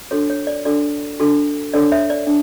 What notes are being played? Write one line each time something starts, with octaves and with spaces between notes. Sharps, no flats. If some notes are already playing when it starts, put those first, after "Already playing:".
D4 F#4 A4 C#5
C#5
D5
D4 F#4 A4 D5
D4 F#4 A4
D4 A4 C#5 D5
C#5 E5
D5
D4